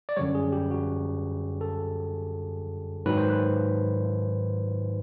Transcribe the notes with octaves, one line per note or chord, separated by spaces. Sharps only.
D5
F#2 D3 G3 C#5
G#4
G4
F#4
A4
G#2 D#3 F#3 B4
C5
B4